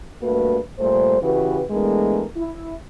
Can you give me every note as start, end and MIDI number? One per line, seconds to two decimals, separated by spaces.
0.22 0.58 43
0.22 0.58 57
0.22 0.58 58
0.22 0.58 66
0.22 0.58 71
0.79 1.18 46
0.79 1.18 55
0.79 1.18 57
0.79 1.18 72
1.22 1.62 49
1.22 1.62 52
1.22 1.62 66
1.22 1.62 67
1.22 1.62 71
1.70 2.24 52
1.70 2.24 56
1.70 2.24 57
1.70 2.24 59
1.70 2.24 62
1.70 2.24 70
2.36 2.73 64